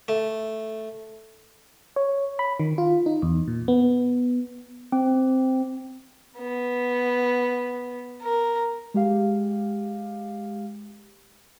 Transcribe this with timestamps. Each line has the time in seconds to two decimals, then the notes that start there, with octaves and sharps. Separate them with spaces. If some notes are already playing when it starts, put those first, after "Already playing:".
0.08 A3
1.96 C#5
2.39 B5
2.60 D#3
2.78 F4
3.06 D#4
3.22 E2
3.48 A#2
3.68 B3
4.92 C4
6.38 B3
8.22 A#4
8.94 G#3 G4 F5